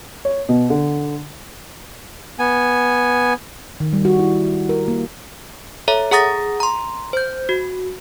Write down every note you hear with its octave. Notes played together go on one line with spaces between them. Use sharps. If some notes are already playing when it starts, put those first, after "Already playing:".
C#5
B2
D3
B3 G#5
D#3
G3
F#4
E4
A#4
A#3
A4 C#5 E5 A#5
G#4 F#5 A#5 D#6 A6 A#6
A#5 C6
C5 G6
F#4